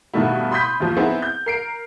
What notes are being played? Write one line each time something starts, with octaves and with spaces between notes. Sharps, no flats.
G2 B2 D#3 A3 E4
B5 C6 D#6 G6 B6
D#2 F3
B3 C4 D#4 E4 G#4
G6
A#4 C7 D7